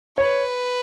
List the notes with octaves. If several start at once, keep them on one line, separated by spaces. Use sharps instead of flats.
B4 C#5